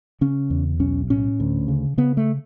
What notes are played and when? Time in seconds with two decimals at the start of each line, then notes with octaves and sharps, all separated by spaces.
0.21 C#3 C#4
0.50 E2
0.80 B1 C#4
1.10 A2 C#4
1.40 D2
1.68 C#3
1.98 C#3 B3
2.17 A3